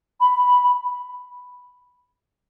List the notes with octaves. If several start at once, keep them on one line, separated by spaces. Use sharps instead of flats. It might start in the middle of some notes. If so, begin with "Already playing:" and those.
B5